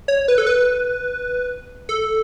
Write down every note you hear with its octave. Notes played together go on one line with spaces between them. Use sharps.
C#5
B4
A4
B4
A4